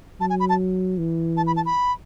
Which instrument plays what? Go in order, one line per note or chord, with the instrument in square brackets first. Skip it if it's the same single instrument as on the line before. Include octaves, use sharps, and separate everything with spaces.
[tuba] F#3 [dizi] A5
[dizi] G#5
B5
A5
[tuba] E3
[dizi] A5
B5
A5
B5